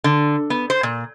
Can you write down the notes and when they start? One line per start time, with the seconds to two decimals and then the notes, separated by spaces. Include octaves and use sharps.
0.04 D3
0.50 B3
0.70 C5
0.83 A#2